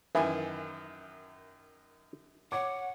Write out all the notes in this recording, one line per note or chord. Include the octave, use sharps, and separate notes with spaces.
F#2 D#3 E3 G#5
C#5 F#5 D6